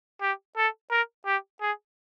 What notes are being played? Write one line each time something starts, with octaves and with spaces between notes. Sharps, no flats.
G4
A4
A#4
G4
G#4